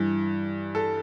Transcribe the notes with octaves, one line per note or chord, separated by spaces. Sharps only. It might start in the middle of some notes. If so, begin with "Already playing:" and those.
Already playing: G2 E3
A4